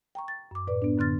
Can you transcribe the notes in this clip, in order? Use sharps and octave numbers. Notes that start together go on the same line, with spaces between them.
G5 A#5 C#6
A6
F#2 D6
A2 B4 D5
B3 D4
F#2 D3 B3 C6 F6 A6